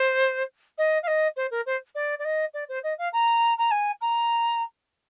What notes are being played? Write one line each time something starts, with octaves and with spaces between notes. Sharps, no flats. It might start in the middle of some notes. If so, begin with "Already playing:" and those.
Already playing: C5
D#5
F5
D#5
C5
A#4
C5
D5
D5
D#5
D5
C5
D#5
F5
A#5
A#5
G#5
A#5